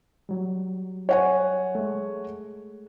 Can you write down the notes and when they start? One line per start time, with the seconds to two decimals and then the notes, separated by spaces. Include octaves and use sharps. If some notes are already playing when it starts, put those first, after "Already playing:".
0.29 F#3 G3
1.09 C#5 F#5 G#5
1.75 G#3 A3